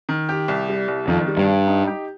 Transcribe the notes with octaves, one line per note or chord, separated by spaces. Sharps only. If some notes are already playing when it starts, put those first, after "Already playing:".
D#3
G4
C2
G3
C2
F2 D#3
G3
G2
G3
D#4
G4